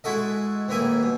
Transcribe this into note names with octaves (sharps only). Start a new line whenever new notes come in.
G#3 E4 F#4 A4 D#5
A1 D#2 E3 E4 G#5 D#6
B2